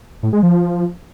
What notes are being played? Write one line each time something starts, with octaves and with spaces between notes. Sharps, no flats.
A2
G#3
F3